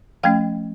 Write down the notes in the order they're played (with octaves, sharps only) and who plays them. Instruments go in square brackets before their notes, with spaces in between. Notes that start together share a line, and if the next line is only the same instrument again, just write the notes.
[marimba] F3 A3 C#4 F5 G5